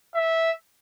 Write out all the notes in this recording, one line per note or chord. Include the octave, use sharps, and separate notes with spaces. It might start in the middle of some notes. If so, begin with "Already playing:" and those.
E5